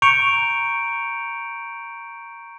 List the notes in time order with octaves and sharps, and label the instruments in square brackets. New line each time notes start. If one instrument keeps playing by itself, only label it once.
[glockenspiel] A#5 C#6 G6 C#7 D7 F7